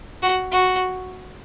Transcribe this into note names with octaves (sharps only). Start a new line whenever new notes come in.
F#4
F#4